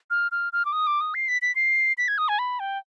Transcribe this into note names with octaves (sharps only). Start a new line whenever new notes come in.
F6
F6
F6
D6
D#6
D6
D#6
C7
B6
B6
C7
B6
G#6
D#6
G#5
B5
G5